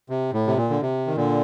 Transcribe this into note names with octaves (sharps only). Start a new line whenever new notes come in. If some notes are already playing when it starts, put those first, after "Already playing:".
C3
A2
C3
A#2
D3
C3
D#3
A#2 D3